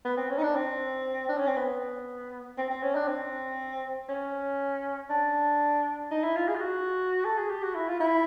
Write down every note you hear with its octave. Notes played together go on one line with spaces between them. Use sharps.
B3
C4
C#4
D#4
D4
C4
D4
C#4
C4
B3
C4
C4
C#4
D4
C4
C#4
D4
D#4
E4
F4
G#4
F4
F#4
A4
G#4
G4
F#4
E4
F4
E4